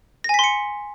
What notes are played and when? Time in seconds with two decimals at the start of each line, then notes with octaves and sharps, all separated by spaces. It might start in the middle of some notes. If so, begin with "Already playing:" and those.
0.24 A#6
0.29 G#5
0.34 B6
0.39 C6
0.44 C#7